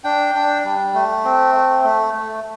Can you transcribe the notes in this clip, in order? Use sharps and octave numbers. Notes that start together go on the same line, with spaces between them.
D4 G5
D4
G3
A3
C4
A3
A3
A3